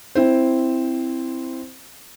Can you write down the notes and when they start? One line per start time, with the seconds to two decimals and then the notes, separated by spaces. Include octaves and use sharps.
0.15 C4 E4 C5